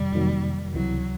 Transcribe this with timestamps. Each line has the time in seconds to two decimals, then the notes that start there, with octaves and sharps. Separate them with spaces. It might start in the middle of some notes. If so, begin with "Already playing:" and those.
Already playing: F2 C3 D#3 G3
0.13 F2 C3 D#3 F#3 A#3
0.74 C#2 C3 E3 F#3